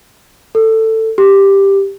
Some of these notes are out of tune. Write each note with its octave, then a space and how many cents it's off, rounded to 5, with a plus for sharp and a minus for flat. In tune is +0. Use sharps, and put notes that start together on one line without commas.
A4 +15
G4 +5